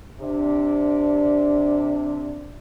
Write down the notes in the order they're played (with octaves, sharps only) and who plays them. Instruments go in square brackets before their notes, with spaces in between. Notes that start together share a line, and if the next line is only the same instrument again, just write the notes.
[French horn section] C3 D4